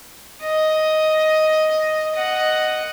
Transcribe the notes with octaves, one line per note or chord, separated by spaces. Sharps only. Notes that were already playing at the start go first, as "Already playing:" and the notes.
D#5
D#5 F#5